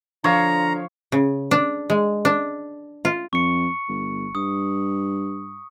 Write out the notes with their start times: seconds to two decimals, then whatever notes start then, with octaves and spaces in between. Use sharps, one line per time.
0.24 D3 F3 C#5 F5 A#5
1.12 C#3
1.51 D4
1.90 G#3
2.25 D4
3.05 F4
3.33 F2 C#6 C#7
3.89 G1
4.35 G2 D#6